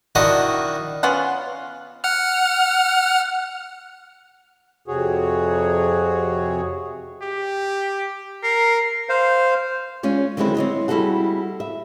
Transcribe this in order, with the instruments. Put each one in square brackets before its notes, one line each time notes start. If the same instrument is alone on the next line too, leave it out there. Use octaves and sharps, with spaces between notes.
[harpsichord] D#3 D4 E4 F#4 D#5 F#5
[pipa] B3 C#4 F4 F#5
[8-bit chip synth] F#5 F6
[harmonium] F2 C3 F#4 G#4 C#5
[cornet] G4
[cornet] A#4 [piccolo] C7
[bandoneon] C5 F5
[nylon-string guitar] G#3 C#4 F4 C#5 D5
D3 D#3 F#3 G#3 C4 E4
C4 C#5 D#5
G3 E4 F#4 G#4 A4 F#5
E5